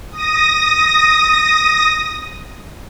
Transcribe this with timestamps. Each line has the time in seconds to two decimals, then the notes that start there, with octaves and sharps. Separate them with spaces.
0.11 D#6 A#6